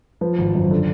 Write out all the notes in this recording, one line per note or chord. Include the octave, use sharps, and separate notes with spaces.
F3 B4
G#1
F#2
D3